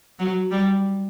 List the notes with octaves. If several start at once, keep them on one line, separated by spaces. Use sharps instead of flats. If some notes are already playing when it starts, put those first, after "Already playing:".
F#3
G3